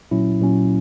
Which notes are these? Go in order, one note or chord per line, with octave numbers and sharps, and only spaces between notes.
A#2 F#3 C#4 E4
A#2 F#3 C#4